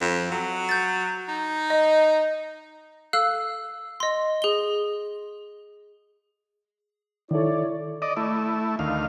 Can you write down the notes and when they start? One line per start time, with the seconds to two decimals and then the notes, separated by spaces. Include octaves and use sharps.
0.01 F2
0.31 F#3
0.69 G6 A6
1.28 D#4
1.70 D#5
3.13 A4 F5 E6 F#6
4.00 D#5 C6
4.42 G#4 G7
7.31 D#3 E4 A4 C#5 D5
8.02 D5 D#5
8.17 A3 E4
8.79 D2 D#3 F5